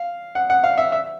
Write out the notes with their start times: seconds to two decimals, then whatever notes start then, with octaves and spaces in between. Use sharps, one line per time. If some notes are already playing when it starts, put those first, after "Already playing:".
Already playing: F5
0.35 F#5
0.50 F#5
0.64 F5
0.78 E5
0.92 E5